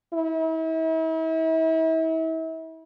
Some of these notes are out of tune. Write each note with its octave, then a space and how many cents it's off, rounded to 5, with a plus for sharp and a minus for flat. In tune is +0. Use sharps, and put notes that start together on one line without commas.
E4 -40